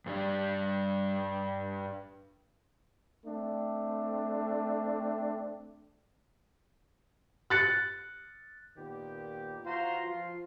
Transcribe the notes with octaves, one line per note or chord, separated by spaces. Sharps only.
G2 G3 D4
A3 C4 D4
F#6 A6 C#7
A#2 D#3 B3 G4
E3 F4 F#4 C5 A#5 C6
F3 F4 C6